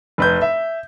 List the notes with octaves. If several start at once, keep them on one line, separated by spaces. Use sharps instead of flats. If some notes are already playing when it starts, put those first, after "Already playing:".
F1 B4 G6
E5